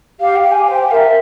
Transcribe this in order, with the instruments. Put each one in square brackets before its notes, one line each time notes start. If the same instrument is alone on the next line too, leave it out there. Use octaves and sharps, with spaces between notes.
[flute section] G4 [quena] F5
[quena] G5
[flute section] G4
[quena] G#5
[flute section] C5 [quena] G5
[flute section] A#4 [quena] E5 F5